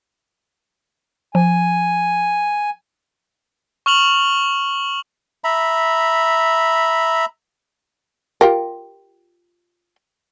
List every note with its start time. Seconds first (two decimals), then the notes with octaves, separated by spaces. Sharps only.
1.35 F3 G#5
3.86 C#6 F6 F7 F#7
5.44 E5 A#5 B5
8.41 F4 G4 A#4